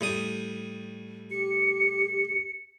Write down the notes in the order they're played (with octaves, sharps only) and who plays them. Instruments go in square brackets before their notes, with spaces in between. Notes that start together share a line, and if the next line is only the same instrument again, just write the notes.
[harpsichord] A2 G3 D#6
[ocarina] G4 [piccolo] C#7